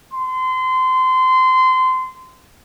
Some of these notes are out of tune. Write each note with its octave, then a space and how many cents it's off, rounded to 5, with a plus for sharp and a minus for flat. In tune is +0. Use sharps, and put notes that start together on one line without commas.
C6 -25